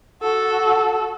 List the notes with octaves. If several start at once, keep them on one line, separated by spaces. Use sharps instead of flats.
F#4 A4